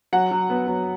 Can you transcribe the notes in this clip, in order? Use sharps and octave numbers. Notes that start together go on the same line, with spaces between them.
F#3 F#5
F#3
B3
F#3